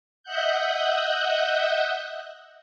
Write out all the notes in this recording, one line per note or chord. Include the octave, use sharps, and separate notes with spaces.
D#5 E5 F#5 F#6 G6